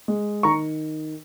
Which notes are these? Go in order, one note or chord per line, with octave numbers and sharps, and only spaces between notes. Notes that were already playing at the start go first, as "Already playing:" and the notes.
G#3
D#3 A#5 C#6